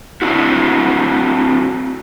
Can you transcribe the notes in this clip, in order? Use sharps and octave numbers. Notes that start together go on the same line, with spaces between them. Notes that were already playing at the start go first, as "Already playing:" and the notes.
C4 D4 E4 F#4